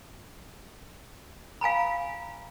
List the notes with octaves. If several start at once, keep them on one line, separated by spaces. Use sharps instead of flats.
F5 G#5 A#5 B5